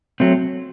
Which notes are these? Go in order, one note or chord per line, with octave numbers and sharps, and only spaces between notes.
F#3 A3 C4